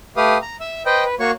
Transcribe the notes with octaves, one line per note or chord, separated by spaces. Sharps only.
A3 G4 B4 F5 D#6
A#5
E5 E6
B4 C5 D#5 G5
B4
A#3 F#4 C#5 C#6